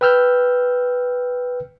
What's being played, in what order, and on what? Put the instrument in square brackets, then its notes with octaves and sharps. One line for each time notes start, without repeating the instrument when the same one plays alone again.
[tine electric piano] B4 G5 E6 F6 G6